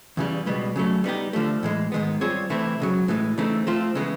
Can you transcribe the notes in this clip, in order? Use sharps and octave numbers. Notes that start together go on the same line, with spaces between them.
E2 C#3 E3 G3
C#2 B2 G3 B3
C#3 F#3 A3
G3 B3 D#4 G4
D3 F3 A3
A2 E3 G#3
G#2 D#3 G#3 B3
G3 C4 F4 G#4 C#5
C3 E3 A3 C4 E4
C#2 C#3 F#3
A2 E3 G#3
C#3 E3 A3 C4 D#4
F3 A3 C4 F4
C#3 E3 G#3 B3